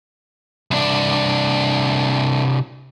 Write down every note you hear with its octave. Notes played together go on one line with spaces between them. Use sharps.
C2 D4